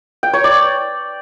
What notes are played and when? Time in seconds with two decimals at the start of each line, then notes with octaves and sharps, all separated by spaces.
0.23 G5
0.34 C#5
0.44 D5